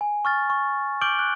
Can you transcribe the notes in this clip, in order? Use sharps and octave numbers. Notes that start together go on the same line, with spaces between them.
G#5
C#6 F6 A6
C#6
D6 F6 G6 D7 F#7 G7
F#6